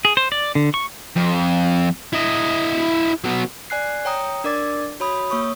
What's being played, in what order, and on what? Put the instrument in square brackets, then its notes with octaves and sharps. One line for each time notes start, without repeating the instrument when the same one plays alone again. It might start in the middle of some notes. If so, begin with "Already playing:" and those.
[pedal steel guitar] G#4
C5
D5
D3
C#6
[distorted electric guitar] F2
E4 D#5
F#3 B3
[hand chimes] D5 G#5 F#6 C7
C#5 G5 A#5 D#6
D4 A#4 D5 D6 A6
F#4 C#5 B5 D#6
A#3 C#5 C#6 D#6